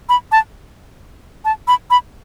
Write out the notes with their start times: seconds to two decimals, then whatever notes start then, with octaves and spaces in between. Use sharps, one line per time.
0.09 B5
0.32 A5
1.45 A5
1.68 B5
1.91 B5